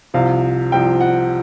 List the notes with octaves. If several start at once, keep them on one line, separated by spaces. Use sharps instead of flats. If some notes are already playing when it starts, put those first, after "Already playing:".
C2 C3 F3 F5
C2 C3 F3 G5
F#5